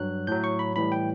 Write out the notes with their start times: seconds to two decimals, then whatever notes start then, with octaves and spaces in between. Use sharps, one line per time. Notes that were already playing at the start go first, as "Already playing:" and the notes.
Already playing: G2 F#3 F#6
0.27 A2 F#3 G6
0.44 C#6
0.59 B5
0.76 A2 E3 G3 B5
0.92 G5